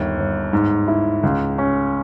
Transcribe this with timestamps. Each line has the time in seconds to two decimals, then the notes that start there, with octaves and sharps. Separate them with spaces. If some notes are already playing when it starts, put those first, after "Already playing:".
Already playing: G1 D#2
0.18 G1
0.53 G#2
0.88 E4
1.23 C#2
1.58 C#4